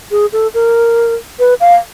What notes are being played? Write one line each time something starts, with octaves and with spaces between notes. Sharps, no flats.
G#4
A4
A#4
B4
F5